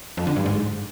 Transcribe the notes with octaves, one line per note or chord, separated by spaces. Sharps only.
F2
D3
G2
G#2